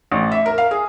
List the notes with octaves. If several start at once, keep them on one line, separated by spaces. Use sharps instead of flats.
A1
E5
A#4
F5
G#4